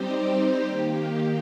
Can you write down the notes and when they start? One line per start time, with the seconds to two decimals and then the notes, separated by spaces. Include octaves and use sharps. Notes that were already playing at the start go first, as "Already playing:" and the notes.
Already playing: G3 C4 D#4 G4 C5
0.64 D#3 A#3 G4